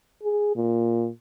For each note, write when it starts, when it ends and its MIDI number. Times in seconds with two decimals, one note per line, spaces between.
0.23 0.53 68
0.56 1.08 46